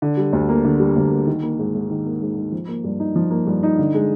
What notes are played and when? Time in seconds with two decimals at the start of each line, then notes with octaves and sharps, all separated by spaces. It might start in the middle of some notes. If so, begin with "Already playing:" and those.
0.02 D3
0.17 G3
0.33 D2
0.49 A#3
0.64 D3
0.80 G3
0.96 D2
1.11 A#3
1.27 D#3
1.43 A#3
1.59 G#2
1.75 G#2
1.90 D#3
2.06 A#3
2.22 G#2
2.37 G#2
2.52 F3
2.68 A#3
2.84 G2
3.00 D#4
3.16 F3
3.31 A#3
3.47 G2
3.63 D#4
3.79 D3
3.94 G#3